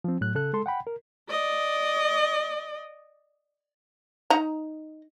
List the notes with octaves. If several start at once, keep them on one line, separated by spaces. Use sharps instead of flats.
F3 C4
A2 F#3 F#6
C#3 A4 F#6
G#3 A4 C6
F#5 G5 B5
A#4
D5 D#5
D#4 A#5